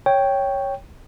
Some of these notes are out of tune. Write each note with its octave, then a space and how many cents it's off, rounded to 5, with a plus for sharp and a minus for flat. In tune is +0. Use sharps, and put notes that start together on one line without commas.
C#5 +0 G5 +0